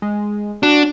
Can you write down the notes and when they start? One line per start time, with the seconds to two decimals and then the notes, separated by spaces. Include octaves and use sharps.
0.02 G#3
0.63 D4 F#4